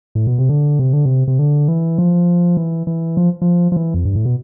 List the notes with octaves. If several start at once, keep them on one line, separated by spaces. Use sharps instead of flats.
A2
B2
C3
D3
C3
D3
C3
C3
D3
E3
F3
E3
E3
F3
F3
F3
E3
F2
G2
A2
B2